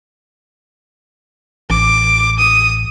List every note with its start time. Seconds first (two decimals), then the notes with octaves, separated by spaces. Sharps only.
1.70 A1 D6
2.39 D#6